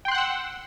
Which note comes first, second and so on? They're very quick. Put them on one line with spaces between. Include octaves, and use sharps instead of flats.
G5 C6 F#6 F#5 E6